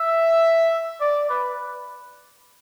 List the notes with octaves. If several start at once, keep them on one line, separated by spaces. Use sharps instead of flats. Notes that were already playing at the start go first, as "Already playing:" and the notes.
Already playing: E5
D5
B4